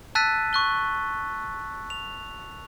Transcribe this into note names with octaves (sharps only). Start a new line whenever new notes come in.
A5 E6 F#6 A6 B6 D#7
C#6 F#6 G7
F7